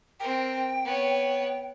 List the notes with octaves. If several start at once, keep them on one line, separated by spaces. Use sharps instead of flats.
C4 A#4 G5
B3 C#5